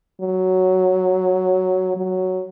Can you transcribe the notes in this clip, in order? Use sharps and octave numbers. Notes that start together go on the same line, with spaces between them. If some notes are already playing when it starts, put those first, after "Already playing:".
F#3
F#3